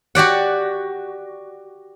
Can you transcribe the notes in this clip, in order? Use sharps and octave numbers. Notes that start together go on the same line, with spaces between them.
F#4 G4 D5 F#5